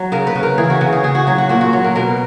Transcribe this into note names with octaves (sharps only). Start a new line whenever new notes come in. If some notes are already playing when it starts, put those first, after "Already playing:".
Already playing: F#3 F#4
C#3 A#4
B4
C#3
A#4
E3 G#4
F#4
C#3 F#4
G#4
C#3 G#4
F#4
F#3 G#4
F#4
A#2 F#4
F#4
F#3
A#4
B2 A#4